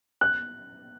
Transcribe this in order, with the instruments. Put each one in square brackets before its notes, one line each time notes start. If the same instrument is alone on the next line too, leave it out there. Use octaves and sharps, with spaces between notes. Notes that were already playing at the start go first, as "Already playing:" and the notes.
[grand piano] F#6